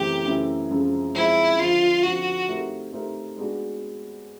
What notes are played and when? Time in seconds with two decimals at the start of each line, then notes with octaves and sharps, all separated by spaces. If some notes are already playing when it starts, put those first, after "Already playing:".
Already playing: F#2 C#3 E3 A3 C4 G4
0.24 F#2 C#3 E3 A3 C4
0.70 F#2 C#3 F3 G#3 C4
1.14 F#2 C#3 F3 G#3 C4 E4
1.59 F2 D3 F3 F4
2.03 F2 D3 F3 F#4
2.48 A3 C4 D#4 G4 A#4
2.92 A3 C4 D#4 G4 A#4
3.37 G#3 B3 D4 F#4